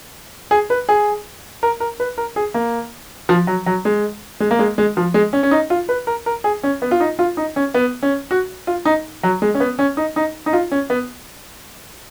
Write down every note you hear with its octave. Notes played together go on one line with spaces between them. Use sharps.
G#4
B4
G#4
A#4
A#4
B4
A#4
G#4
A#3
F3
F#3
F#3
G#3
G#3
A#3
G#3
G#3
F3
G#3
C#4
C#4
D#4
F4
B4
A#4
A#4
G#4
C#4
B3
F4
D#4
F4
D#4
C#4
B3
C#4
F#4
F4
D#4
F#3
G#3
C#4
B3
C#4
D#4
D#4
D#4
F4
C#4
B3